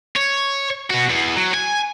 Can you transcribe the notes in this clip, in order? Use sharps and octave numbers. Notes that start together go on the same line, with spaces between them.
C#5
B2 F#4
E2
F#3
G#5